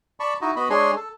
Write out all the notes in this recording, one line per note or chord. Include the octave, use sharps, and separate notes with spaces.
D5 A5 B5 C#6
D#4 E4 F#4 D#5
B3 F#4 D#5 B5
G#3 D4 G#4 C#5 C6
A4